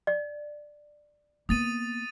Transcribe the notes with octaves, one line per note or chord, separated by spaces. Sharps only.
D5
A#3 B3 D#6 A6 D#7